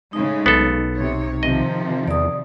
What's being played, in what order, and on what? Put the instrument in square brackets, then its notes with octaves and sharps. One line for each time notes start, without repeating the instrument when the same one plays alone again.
[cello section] A2 C#3 G#3 [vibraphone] D#4
[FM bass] B1 [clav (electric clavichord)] B3 A4
[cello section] C3 C#5
[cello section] C3 D#3 F3 [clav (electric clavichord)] D#5
[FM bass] E2 [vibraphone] D5 D#6